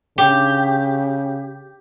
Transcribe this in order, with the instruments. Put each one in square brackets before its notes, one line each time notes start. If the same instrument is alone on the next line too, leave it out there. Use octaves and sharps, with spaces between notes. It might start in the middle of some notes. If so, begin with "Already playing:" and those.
[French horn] C#3 [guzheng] G4